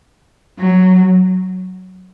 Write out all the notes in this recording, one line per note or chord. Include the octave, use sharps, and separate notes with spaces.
F#3